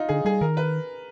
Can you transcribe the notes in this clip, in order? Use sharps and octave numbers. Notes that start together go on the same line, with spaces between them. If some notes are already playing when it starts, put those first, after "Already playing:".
Already playing: D#4 F4
D3 G#4
G3 G#4
D#3 A#4
B4